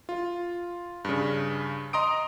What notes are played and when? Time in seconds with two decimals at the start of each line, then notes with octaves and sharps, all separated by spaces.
0.09 F4
1.05 G2 C#3
1.93 D#5 A#5 C6 D#6 D7